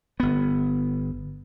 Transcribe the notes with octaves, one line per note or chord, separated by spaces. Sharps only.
G1 B3